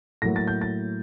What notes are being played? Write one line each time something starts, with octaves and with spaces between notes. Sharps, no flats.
A2 F#3 A#3 A#6
A6
G6
A6